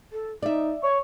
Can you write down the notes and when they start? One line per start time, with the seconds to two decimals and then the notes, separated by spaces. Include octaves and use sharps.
0.13 A4
0.42 D#4 D5 E5
0.83 C#5 C#6